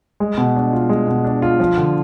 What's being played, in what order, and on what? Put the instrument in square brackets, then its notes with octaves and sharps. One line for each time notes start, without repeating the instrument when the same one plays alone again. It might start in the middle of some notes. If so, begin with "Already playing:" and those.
[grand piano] G#3
B2
D4
F4
G#3
B2
D4
F4
F3
D3